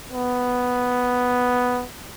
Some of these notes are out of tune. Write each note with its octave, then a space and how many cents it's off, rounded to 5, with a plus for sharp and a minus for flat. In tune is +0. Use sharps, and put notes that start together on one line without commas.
B3 +0